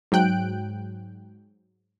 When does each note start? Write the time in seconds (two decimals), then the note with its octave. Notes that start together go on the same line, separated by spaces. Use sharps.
0.12 G#2 F#3 G5 F#6 D7